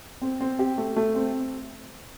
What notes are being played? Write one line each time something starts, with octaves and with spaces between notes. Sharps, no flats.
C4
C4
G4
A3
A3
C4